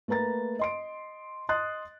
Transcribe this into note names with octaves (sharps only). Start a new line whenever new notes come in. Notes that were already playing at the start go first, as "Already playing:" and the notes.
A3 A#3 B4 A#5 A6
D#5 C6 D7
D#5 C6 D#6 F#6 A6